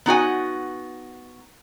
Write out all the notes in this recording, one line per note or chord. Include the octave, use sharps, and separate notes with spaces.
B3 D#4 F#4 G#5